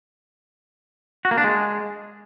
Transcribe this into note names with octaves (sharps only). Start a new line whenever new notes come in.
F#4
A#3
D4
G#3